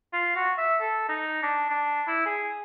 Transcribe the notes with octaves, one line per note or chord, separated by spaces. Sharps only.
F4
F#4
E5
A4
D#4
D4
D4
E4
G#4